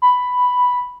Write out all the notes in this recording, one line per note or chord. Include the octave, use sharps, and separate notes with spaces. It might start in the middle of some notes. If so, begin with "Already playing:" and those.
B5